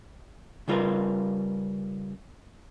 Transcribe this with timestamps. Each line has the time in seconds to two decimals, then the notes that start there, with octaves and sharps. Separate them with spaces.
0.68 C#3 G3 F4 A#4 B4